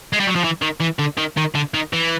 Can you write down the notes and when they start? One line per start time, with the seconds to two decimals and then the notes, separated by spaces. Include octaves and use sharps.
0.13 G#3
0.20 G3
0.27 F#3
0.36 F3
0.44 E3
0.62 D#3
0.81 E3
0.99 D3
1.18 D#3
1.37 D#3
1.55 D3
1.74 D#3
1.93 E3